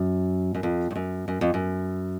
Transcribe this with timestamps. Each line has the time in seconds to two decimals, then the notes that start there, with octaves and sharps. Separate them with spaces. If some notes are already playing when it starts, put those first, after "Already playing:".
Already playing: F#2
0.55 F#2
0.63 F2
0.91 G2
0.96 F#2
1.28 F#2
1.41 F2
1.54 F#2